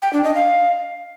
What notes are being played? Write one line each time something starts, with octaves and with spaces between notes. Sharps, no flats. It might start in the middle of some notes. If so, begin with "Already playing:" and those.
G5
D4
D#5
F5